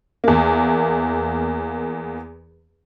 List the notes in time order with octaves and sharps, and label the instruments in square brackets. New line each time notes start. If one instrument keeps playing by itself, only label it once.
[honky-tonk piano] E2 A#3